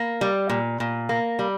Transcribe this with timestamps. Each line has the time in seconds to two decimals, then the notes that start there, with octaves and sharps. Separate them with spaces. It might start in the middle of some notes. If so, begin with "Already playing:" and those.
Already playing: A#3
0.21 G3
0.49 A#2
0.80 A#2
1.09 A#3
1.39 G3